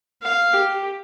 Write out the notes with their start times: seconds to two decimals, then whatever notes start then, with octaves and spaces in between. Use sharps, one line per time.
0.22 F5
0.53 G4